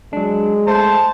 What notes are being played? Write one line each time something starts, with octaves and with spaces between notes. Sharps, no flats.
F#3 G#3 D4
A3 C5 A5